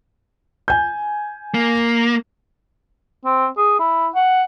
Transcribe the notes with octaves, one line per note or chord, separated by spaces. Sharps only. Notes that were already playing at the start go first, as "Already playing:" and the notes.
G#5 G6
A#3
C4
G#4
E4
F#5